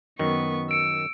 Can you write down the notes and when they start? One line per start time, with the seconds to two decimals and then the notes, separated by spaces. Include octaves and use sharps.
0.19 F#2 D#3 B3 C#6
0.71 E6 C#7 D7